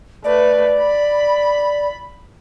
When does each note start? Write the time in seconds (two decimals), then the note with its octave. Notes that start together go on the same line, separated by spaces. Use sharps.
0.24 A3 B4 D5
0.79 B5